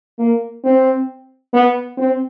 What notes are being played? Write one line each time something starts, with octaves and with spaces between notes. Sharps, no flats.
A#3
C4
B3
C4